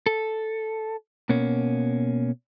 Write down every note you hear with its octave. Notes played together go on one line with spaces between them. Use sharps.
A4
B2 A#3 C#4